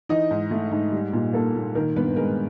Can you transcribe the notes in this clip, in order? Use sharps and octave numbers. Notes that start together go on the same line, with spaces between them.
E3 D#4 D#5
G#2
A3
G#2
G3
A#2
A#3 A4
A#2
D#3 A#4
G2 B3 B4
G#3 A#4